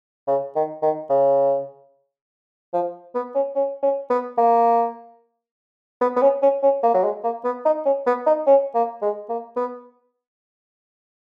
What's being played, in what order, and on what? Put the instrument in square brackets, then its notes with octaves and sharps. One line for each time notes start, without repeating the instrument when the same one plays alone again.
[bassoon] C#3
D#3
D#3
C#3
F3
B3
C#4
C#4
C#4
B3
A#3
B3
B3
C#4
C#4
C#4
A#3
F#3
G#3
A#3
B3
D#4
C#4
B3
D#4
C#4
A#3
G#3
A#3
B3